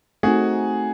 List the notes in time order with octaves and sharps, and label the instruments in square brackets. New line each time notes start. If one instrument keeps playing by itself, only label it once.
[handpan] A3 C4 D#4 [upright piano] F#4 G#4